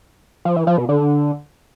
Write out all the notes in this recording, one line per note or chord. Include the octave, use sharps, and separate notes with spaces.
F3
E3
F3
B2
D3